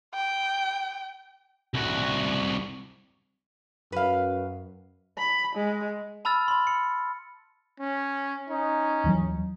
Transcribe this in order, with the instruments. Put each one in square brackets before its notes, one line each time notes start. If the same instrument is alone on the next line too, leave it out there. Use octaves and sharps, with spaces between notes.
[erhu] G5
[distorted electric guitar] C2 F#4
[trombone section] F#2 [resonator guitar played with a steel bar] B4 F5
[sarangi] B5
G#3
[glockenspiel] A5 B5 E6 F6 A6
B5 C6
C#7
[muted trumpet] C#4
[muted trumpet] C#4 [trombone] D#4
[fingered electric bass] D#2 E3 F#3